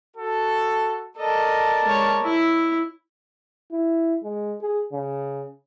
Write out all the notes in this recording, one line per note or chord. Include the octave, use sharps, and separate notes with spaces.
F#4 A4
A4 A#4 D5 D#5 A5
G#3 C#5
E4 E5
E4
G#3
G#4
C#3